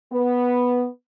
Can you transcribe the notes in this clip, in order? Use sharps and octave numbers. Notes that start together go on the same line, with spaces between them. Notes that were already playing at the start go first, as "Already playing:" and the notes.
B3